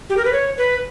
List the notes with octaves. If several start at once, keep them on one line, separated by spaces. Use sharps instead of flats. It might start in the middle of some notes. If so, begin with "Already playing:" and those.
G4
A#4
B4
C#5
B4